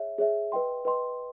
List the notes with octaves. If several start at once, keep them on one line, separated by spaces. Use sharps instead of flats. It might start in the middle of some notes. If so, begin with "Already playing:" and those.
Already playing: G#4 C#5 E5
G#4 C#5 E5
B4 D#5 G5 C6
B4 D#5 G5 C6